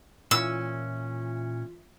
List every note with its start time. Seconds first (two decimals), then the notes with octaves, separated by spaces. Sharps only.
0.31 A#2 E3 C#4 F4 E5 E6